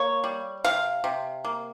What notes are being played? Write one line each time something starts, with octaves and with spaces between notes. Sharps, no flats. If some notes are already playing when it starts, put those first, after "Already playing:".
Already playing: A#3 C#5
G3
C3 F5
C3
A#3